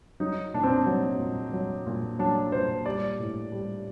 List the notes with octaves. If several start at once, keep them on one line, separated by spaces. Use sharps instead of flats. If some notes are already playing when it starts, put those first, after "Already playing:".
F#3 D#4
A#2 D4
C4
D4
F#3
A#2
F#3
A#2
F#3 D4
A#2 C5
G3 D5
A2
G3